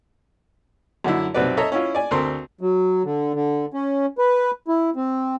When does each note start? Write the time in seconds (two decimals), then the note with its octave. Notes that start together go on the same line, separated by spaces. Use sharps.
1.04 F#2 D3 E4
1.34 B1 C3 C4 F#4 B4 D5
1.57 A4 C#5 D#5 E5 A#5
1.72 C#4 E4 F4
1.95 D5 G#5
2.11 D2 C4 A4 A#4 C6
2.61 F#3
3.05 D3
3.34 D3
3.74 C#4
4.18 B4
4.68 E4
4.96 C4